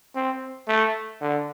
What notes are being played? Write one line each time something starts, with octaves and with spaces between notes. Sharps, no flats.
C4
A3
D3